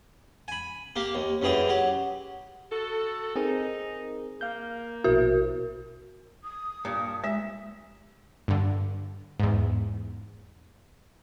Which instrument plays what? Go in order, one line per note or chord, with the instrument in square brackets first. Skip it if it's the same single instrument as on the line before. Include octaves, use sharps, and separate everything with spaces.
[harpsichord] G#5 B5
A#3 G4
D#2
F#2 E3 G#4 G5
F#3 G4
[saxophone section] F#4 A4
[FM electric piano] C4 G#4 A#4 [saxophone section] D#4
[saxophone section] A#3 [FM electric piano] F5 G6
[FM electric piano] A#1 B2 E4 [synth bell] F#4 A#4
[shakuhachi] D#6
[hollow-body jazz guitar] G2 A#2
[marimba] G#3 [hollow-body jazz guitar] E5
[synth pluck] G2 D3
E2 G#2